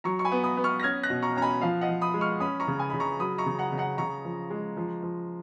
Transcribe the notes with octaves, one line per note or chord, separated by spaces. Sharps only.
F#3 A#5 C#6
C#6
G#5 B5
B3
B5 D#6
B3
C#6 F6
A#6
C#4 F6 G#6
F#6 A#6
B2
A#5 C#6
C#4 A#5
G#5 B5
F3 F5
D#5 F#5
F3
B5 D#6
G#3
C#6 F6
C#4 B5 D#6
A#5 C#6
C#3
G#5 B5
C#3 B5
A#5 C#6
F#3 B5 D#6
A#5 C#6
C#3
F#5 A#5
C#3
F#5 A#5
C#3 A#5 C#6
F3
G#3
F3
F3